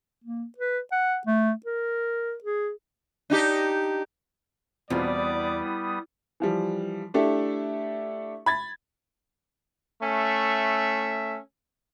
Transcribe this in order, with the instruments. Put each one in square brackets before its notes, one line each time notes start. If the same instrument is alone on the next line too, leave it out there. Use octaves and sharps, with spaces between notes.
[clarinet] A#3
B4
F#5
A3
A#4
G#4
[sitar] D4 D#4 G4
[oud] E2 [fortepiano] B2 C4 F4 [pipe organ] G3 B3 D#6 [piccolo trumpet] D5
[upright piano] E3 F3 G3
A3 D4 E4 G4 A4
B5 G#6 A6
[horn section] A3 C#4 E5